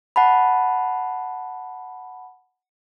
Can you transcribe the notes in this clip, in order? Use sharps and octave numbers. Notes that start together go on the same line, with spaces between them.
F#5 A5 B5